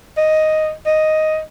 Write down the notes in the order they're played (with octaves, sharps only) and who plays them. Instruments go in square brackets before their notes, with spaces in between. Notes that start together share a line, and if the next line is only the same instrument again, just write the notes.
[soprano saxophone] D#5
D#5